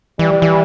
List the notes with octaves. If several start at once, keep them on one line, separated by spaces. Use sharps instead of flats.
E3 G3
E3